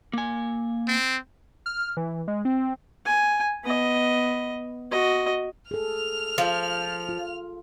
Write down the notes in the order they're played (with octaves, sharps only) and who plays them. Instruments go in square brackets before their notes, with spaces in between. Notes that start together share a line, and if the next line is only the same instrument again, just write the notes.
[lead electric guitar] A#3 G#5
[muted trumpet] C4
[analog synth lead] F6
E3
G#3
C4
[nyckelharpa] G#5
B3 D#5
F#4 D#5
[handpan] G#4 A4 [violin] F6 F7
[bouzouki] F3
[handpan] F4